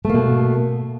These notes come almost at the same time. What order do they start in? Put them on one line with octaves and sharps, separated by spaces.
A3 A#3 B2